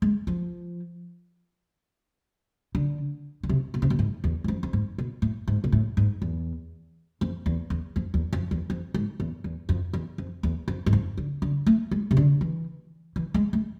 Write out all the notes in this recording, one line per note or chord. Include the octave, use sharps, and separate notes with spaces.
G#3
F3
D3
D3
C3
B2
C3
B2
G#2
E2
G#2
F2
F2
G#2
B2
A2
G#2
B2
A2
G#2
E2
F2
E2
E2
F2
E2
F2
E2
F2
G#2
E2
E2
F2
E2
F2
E2
F2
G#2
F2
D3
D3
A3
G#3
C3
D3
E3
E3
G#3
A3